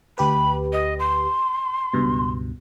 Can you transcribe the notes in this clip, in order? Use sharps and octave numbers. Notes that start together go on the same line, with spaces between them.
D2 G4 B4 B5
D#5
C6
C#2 G2 B2